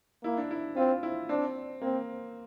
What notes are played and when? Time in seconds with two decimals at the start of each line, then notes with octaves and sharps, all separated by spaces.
0.23 A#3 E4
0.37 D4
0.51 E4
0.76 C4 F4
1.03 E4
1.29 C4 D4
1.81 A#3 C4